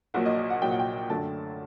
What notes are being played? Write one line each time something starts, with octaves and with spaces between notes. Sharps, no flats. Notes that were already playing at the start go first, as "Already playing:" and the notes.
A#1 A#2 F#3 A#3 F#5
D#5
D#5
F#5
A#1 A#2 F#3 A#3 G5
F#5
G5
F#2 D3 A3 A5